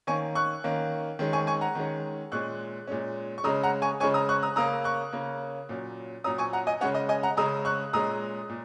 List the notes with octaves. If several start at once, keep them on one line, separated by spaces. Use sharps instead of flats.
D#3 A#3 C#4 G#5 C#6
C#6 F#6
D#3 A#3 C#4
D#3 G#3 C#4
G#5 C#6
G#5 C#6
F#5 A#5
D#3 G#3 C#4
A#2 G#3 C#4 C#6 F#6
A#2 G#3 C#4
C#6
C#3 G#3 C#4 A#5 D#6
F#5 A#5
G#5 C#6
C#3 G#3 C#4 G#5 C#6
A#5 D#6
C#6 F#6
A#5 D#6
C#3 A#3 C#4 A#5 D#6
C#6 F#6
C#3 A#3 C#4
A#2 F#3 C#4
A#2 F#3 C#4 A#5 D#6
G#5 C#6
F#5 A#5
D#5 G#5
C#3 G#3 C#4 C#5 F#5
D#5
D#5 G#5
F#5 A#5
C#3 G#3 C#4 A#5 D#6
C#6 F#6
A#2 G#3 C#4 A#5 D#6
A#2